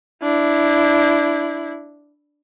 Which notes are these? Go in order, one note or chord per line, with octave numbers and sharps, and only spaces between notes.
D4 E4